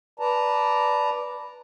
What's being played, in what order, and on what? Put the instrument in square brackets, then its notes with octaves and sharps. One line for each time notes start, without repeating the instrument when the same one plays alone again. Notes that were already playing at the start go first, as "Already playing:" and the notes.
[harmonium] B4 D5 A5 A#5